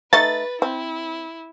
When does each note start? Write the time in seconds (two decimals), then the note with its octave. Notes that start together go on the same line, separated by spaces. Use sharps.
0.13 A3 D#4 B4 A6
0.62 C4 E4